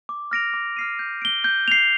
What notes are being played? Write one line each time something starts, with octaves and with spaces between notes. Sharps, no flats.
D6
F6 A#6 D7 F7
D6
F6 C7 D#7
G6
D7 G7
G6
C7 F7